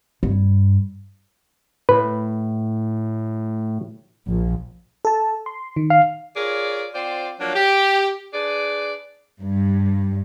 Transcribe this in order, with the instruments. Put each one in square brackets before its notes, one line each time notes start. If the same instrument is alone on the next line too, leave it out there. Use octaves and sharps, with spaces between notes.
[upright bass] G2
[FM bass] A2 [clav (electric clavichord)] B4
[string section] A#1
[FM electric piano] A4 A5
C6
D#3
[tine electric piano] F5
[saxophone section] F4 G#4 A#4 C#5 D5
C4 F4 C5 D5
F3 F#3 A#3 D4 F#4
G4
D4 G#4 B4 D5
[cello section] G2